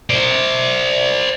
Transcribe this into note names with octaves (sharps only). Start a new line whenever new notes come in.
C5 D5